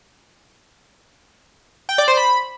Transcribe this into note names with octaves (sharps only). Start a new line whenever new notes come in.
G5
D5
C5
B5